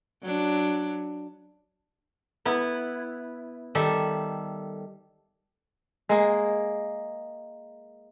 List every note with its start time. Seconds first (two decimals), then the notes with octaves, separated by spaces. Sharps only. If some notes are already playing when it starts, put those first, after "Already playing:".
0.22 F#3 D4
2.45 B3 E4 B4
3.75 D#3 G3 A4 E5
6.09 G#3 A#3 G#4